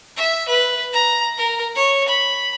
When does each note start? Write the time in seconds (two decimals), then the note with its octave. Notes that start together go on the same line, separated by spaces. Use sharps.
0.16 E5
0.49 B4
0.93 A#5
1.38 A#4
1.76 C#5
2.08 B5